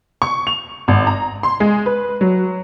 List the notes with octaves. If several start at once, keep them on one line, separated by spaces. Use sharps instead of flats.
C#6
F7
G#1
A#5
C6
G#3
B4
F#3